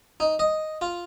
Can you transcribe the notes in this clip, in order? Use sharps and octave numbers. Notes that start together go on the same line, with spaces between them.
D#4
D#5
F4